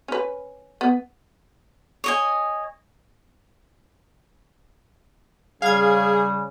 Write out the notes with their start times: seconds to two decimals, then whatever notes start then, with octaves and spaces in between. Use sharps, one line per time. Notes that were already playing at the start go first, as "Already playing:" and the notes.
0.08 C#4 B4
0.81 B3
2.04 C#5 D#5 G#5
5.62 C#3 G3 G#4 F5 G#6